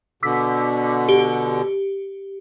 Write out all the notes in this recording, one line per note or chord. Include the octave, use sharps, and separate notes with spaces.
B2 D3 D6 E6 B6
G4